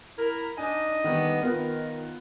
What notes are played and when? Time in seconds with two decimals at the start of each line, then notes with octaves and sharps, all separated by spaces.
0.18 E4 A#4
0.57 D4 D#4 D#5 G#5
1.04 D3 D#3 G3 B3
1.41 D#3 B3 F4 A#4